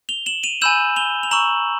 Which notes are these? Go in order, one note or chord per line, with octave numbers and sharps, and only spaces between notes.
F7 G7
E7 F#7
D#7 F7
G#5 B5 E6 G6 E7 F#7
F7 G7
F7
A#5 C#6 E6 E7 F#7